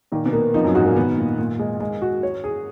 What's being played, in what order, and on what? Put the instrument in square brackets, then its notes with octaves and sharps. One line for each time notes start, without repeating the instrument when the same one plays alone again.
[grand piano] A#2 A#3 [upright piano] D#3
[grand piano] B2 B3
[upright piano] A#3
[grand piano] F2 F3 [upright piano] D#4
[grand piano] F#2 F#3
[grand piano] G#2 G#3 [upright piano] F#4
[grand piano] A#2 A#3
[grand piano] D#3 [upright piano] B3
[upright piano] A#2
A#2
G#3
G#3
F#4
C#5
G#4